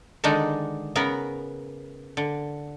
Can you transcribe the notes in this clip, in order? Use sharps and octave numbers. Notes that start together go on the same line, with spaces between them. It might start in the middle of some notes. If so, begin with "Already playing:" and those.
D3 D#3 G#3 D4 D#4
C#3 B3 A#4
D3